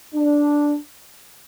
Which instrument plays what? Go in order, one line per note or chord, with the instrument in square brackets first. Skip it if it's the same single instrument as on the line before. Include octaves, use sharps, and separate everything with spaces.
[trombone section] D4